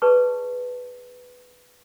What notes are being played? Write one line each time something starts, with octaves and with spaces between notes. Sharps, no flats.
G#4 B4 D5 A5 C#6